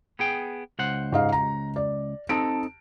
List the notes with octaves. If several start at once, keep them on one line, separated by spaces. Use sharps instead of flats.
B3 G#4 G5
C#2 C5 F#5
G#2 D#5 F5
A#5
D5
C4 D#4 A4 A5 D7